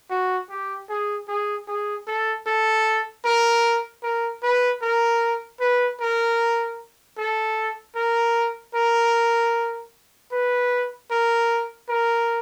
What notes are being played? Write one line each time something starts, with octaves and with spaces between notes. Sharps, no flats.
F#4
G4
G#4
G#4
G#4
A4
A4
A#4
A#4
B4
A#4
B4
A#4
A4
A#4
A#4
B4
A#4
A#4